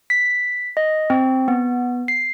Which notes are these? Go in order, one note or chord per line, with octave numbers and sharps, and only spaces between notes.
B6
D#5
C4
B3
C7